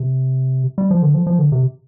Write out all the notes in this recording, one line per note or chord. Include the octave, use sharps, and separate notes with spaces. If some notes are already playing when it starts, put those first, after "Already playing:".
Already playing: C3
G3
F3
D3
F3
F3
D3
C3